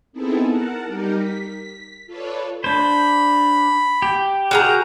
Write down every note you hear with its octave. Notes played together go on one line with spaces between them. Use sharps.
B3 C4 D#4 E4 G#4 A4
A#4 F#5 A5
G3 D#4 G4 A#4
B6
F4 A4 B4 C#5 D5
D4 C5 B5
G4
F#4 G#4 A#4 A#5